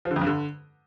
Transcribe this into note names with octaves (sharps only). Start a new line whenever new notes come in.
F3
D3
F2
G2
D3